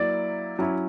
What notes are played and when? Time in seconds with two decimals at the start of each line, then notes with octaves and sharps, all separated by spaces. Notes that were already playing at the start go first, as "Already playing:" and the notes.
Already playing: F#3 A#3 E4 D5
0.59 F#3 C#4 E4